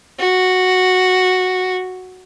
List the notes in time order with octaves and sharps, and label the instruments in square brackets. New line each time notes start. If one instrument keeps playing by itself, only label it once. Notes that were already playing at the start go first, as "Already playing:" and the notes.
[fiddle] F#4